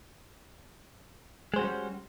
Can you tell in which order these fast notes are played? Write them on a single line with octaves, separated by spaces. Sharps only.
G#3 C5 F#4 C#4 G3